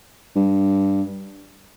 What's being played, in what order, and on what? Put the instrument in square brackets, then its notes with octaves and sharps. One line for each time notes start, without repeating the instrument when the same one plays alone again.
[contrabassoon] G2